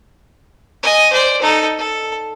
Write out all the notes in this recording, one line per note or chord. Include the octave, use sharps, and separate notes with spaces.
D#5 G#5
C5 D5
D#4 A4
A4